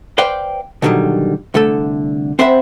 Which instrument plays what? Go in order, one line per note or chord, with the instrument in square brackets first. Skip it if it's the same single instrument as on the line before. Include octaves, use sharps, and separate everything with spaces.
[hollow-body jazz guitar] B4 C5 D5 F5 G5
B2 D3 D#3 F#3 G3
C2 D3 A3 A4
C4 C5 E5 F#5 B5